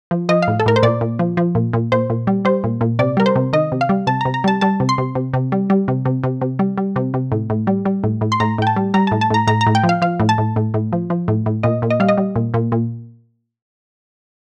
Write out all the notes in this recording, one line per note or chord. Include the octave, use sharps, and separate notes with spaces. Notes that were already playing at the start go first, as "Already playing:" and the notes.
F3
F3 D#5
F5
A2
A4
A2 A#4
C5
A#2 D5
A#2
F3
F3
A#2
A#2
A#2 C5
A#2
G3
G3 C5
A#2
A#2
C3 D5
G3 A#4
C5
C3
D#3 D#5
C3
F5
G3
C3 A5
A#5
C3
A#5
G3 A5
G3 A5
C3
C6
C3
C3
C3
G3
G3
C3
C3
C3
C3
G3
G3
C3
C3
A2
A2
G3
G3
A2
A2
C6
A2 A#5
A2 G5
A5
G3
G3 A#5
A2 A5
A5
A2 A#5
A2 A#5
A#5
A2
G5
F3
F5
F3 F5
A2
A5
A2
A2
A2
F3
F3
A2
A2
A#2 D#5
A#2
D#5
G3 F5
D#5
G3
A#2
A#2
A#2